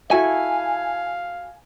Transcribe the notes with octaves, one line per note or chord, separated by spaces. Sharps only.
E4 F#4 A4 F5 G#5